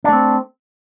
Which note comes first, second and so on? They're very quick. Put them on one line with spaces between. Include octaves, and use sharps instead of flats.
D4 A3 C4